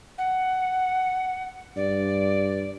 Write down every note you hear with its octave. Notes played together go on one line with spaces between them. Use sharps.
F#5
G2 D5